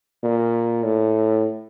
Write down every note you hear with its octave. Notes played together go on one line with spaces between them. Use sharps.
A#2
A2